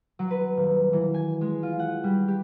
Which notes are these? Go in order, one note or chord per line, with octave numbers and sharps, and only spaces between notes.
F#3
B4
D#1
E3
G#5
G#3
F4
F#5
G3
G4